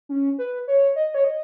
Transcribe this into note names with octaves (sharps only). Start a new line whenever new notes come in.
C#4
B4
C#5
D#5
C#5
D#5